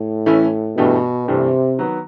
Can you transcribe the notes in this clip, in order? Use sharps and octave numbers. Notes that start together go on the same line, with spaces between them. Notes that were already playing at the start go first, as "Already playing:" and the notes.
Already playing: A2
E3 A3 C#4 E4
G2 B2 E3 A3 D4 G4
G2 C3 E3 A3 D4 G4
D#3 F#3 B3